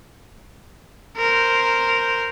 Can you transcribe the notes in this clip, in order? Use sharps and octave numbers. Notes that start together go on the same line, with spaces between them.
A#4 C5